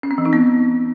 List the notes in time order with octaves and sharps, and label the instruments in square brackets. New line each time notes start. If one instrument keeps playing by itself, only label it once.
[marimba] C#4
C4
E3
D#4
B3